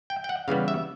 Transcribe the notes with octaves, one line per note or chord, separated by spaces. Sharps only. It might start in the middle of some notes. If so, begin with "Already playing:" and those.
G5
G5
F#5
C#3 E3 G3 B3 F5
E5